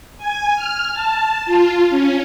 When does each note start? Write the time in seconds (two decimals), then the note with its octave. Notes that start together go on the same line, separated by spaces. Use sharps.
0.17 G#5
0.55 F6
0.93 A5
1.45 F4
1.90 C#4